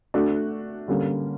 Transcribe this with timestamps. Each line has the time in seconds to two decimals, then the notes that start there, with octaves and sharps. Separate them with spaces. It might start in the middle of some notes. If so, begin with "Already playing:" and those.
0.14 A3 D4 F#4
0.88 D3 G3 A#3 C#4